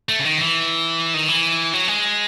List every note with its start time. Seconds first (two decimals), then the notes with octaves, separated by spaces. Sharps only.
0.09 A3
0.19 C#3
0.24 D#3
0.38 E3
1.14 D#3
1.29 E3
1.73 F#3
1.88 G#3